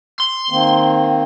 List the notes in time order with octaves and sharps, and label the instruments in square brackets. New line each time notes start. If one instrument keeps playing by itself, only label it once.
[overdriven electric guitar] C6
[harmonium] D#3 A#3 C4